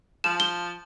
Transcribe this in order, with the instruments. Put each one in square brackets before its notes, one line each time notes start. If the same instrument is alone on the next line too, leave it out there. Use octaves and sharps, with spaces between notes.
[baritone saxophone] F3 [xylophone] E7
[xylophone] G7